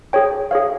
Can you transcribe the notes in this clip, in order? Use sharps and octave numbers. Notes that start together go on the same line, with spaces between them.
G#4 C#5 G5
G#4 C#5 F5